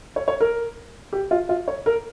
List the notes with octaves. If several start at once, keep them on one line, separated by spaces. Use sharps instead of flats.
C#5
C#5
A#4
G4
F4
F4
C#5
A#4